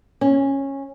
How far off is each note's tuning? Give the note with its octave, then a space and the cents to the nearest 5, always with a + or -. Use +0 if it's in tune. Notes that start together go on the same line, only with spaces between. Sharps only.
C#4 -15